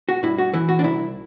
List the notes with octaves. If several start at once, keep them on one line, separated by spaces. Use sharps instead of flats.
F#4
G2 E4
F#4
E3 E4
F#4
D4
C2 E4